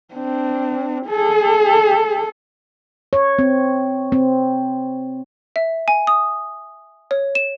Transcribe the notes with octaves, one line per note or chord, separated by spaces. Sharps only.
C4 D4
G#4 A4
C#5
C4
C4
E5
G#5
D#6
C#5
E7